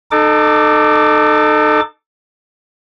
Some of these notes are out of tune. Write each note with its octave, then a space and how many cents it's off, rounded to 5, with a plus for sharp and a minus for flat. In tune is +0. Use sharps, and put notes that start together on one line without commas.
D#4 -35 A4 +0 D6 +0